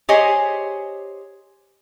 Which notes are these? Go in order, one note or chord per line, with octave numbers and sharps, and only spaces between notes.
G4 G#4 C5 C#5 D#5 G#5